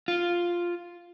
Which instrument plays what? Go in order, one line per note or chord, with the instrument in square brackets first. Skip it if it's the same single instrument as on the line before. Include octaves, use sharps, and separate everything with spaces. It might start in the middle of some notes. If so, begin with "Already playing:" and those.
[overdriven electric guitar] F4